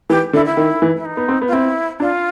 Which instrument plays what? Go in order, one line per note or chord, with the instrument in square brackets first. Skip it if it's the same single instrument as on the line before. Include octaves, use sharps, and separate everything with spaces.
[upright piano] E3 [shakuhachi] G4
[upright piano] D3 [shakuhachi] E4
[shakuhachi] E4
[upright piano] D#3
E3
[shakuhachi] E4
D#4
[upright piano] B3
C4
B3
[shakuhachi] F4
[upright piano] C4 [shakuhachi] E4
[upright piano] D4 [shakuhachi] F4